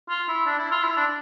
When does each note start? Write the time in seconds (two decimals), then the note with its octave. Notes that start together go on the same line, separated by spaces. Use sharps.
0.09 F4
0.28 E4
0.46 D4
0.59 E4
0.71 F4
0.83 E4
0.97 D4